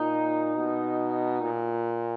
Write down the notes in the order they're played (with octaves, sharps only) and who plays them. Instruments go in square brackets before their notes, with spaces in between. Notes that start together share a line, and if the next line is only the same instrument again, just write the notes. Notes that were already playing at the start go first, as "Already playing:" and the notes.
Already playing: [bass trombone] A#2 [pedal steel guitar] D#4
[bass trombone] B2
A#2